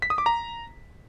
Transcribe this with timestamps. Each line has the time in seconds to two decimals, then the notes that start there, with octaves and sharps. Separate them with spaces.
0.02 B6
0.10 D#6
0.18 D6
0.26 A#5